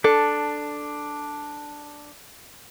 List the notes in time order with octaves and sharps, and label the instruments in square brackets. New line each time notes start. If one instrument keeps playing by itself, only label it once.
[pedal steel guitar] D4 [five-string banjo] A4